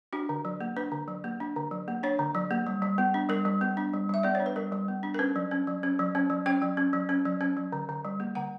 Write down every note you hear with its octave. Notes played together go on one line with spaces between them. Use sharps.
D4 F#4
D3
F#3
A#3
D4 B4
D3
F#3
A#3
D4
D3
F#3
A#3
D4 C#5
D3
F#3
A#3
G3
G3
B3
D4
G3 A#4
G3
B3
D4
G3
G3 E5
B3 D5
D4 C#5
B4
G3 A#4
G3
B3
D4
A#4
C#4 B4
F#3
C#4
F#3
C#4
F#3
C#4
F#3
C#4 G5
F#3
C#4
F#3
C#4
F#3
C#4
F#3
D3
D3
G3
A#3
D3 F#5